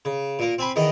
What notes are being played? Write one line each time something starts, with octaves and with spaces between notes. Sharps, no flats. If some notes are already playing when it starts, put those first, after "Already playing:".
C#3
A#2 A#3
C4 G#5 B5
E2 D#3 D#5 F#5